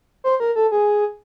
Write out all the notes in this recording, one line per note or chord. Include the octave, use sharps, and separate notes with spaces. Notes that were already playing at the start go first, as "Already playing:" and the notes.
C5
A#4
A4
G#4